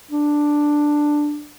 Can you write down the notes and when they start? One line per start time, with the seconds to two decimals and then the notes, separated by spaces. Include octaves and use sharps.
0.11 D4